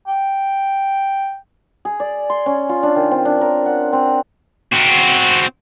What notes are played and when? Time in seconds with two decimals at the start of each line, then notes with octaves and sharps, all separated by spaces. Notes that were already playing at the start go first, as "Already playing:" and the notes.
0.07 G5
1.85 G#4
2.00 D5
2.30 C6
2.46 C#4
2.69 F4
2.83 D4
2.96 D#3
3.11 C4
3.25 D4
3.41 A#4
3.66 F#5
3.93 C4
4.73 C4 F#4